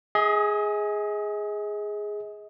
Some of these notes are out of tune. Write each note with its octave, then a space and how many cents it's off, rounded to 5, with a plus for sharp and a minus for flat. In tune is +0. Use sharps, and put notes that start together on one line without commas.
G#4 +0 D#5 +40